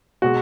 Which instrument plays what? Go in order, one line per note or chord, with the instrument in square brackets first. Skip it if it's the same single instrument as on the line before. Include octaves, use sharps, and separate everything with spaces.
[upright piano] B2 G#3 F#4